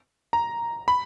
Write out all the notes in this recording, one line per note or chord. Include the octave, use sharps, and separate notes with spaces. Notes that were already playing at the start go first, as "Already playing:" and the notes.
A#5
B5